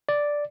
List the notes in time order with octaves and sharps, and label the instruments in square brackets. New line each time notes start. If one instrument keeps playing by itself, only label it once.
[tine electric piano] D5